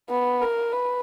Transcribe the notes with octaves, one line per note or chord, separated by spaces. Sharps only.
B3
A#4
B4